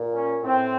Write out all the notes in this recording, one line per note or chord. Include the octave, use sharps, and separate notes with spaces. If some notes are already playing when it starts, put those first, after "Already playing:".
Already playing: A#2
C#4
A2 C4